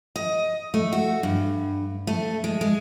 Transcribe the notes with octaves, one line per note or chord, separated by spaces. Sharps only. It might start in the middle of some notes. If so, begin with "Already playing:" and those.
D#5
A3
F#4
G2
A3
G#3
G#3